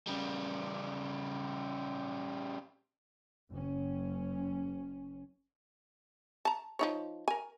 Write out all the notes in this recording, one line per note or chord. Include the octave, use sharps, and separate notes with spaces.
C#3 G3
F#1 C#4
A5 A#5
F3 D#4 C#5
A#4 G#5